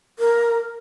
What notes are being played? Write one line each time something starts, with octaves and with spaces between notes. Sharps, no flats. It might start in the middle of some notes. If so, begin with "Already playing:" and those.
A#4